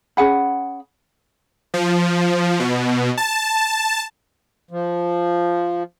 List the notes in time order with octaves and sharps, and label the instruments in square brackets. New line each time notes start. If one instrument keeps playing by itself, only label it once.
[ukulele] C#4 G#4 F#5 B5
[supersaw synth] F3
B2
A5
[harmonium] F3